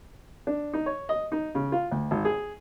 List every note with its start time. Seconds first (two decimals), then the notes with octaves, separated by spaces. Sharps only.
0.47 D4
0.73 D#4
0.86 C#5
1.09 D#5
1.32 D#4
1.55 C#3
1.72 F4
1.91 D2
2.11 G#1
2.25 G#4